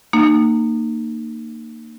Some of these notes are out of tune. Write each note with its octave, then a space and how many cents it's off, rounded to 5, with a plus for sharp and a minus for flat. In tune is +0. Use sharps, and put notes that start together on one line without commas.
A#3 -20 D#4 -35